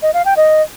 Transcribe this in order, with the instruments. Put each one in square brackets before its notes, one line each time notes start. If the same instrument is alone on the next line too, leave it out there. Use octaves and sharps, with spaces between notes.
[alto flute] D#5
F5
G5
D#5